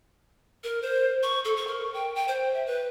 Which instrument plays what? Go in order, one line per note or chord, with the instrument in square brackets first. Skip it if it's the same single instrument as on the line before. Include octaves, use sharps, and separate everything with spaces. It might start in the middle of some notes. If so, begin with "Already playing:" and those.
[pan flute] A#4
C5
C#6
A4
C#6
A#4
G5
G5
C5
E5
B4